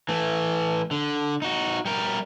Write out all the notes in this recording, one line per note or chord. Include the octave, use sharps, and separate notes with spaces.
E3 A3
D3
D#4 F#4
G3 A#4